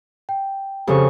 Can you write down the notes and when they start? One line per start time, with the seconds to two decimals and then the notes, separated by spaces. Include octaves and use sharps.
0.29 G5
0.87 F2 C#3 G4 A4 C5 C#6